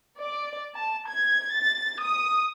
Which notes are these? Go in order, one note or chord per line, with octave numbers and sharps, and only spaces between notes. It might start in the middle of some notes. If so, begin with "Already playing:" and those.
D5
A5
G#6
A6
D#6